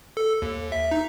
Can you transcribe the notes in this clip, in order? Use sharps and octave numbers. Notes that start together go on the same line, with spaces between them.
A4
D#2
E5
D#4